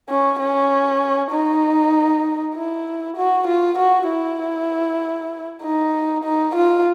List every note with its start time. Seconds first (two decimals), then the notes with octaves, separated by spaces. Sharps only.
0.09 C#4
0.39 C#4
1.31 D#4
2.55 E4
3.16 F#4
3.47 F4
3.78 F#4
4.08 E4
5.62 D#4
6.24 D#4
6.55 F4